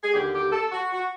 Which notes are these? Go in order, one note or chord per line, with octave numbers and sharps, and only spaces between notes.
G#4
D#2 D3 G4
G4
A4
F#4
F#4